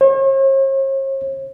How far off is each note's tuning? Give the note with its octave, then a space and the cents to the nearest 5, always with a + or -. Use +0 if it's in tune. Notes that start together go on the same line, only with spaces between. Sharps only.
C#5 -45